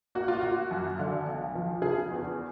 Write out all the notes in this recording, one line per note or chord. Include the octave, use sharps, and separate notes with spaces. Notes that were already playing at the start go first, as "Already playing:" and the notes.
A#3 F#4
F4
A#3 F#4
F#2
D3
B1
F3
C#3 G#4
E2